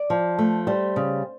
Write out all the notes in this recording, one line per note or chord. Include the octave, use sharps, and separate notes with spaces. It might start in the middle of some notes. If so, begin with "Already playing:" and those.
Already playing: D5
F3
A3
G3 C5
C#3